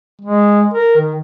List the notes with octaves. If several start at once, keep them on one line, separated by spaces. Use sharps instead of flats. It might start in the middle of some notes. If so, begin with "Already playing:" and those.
G#3
A#4
D#3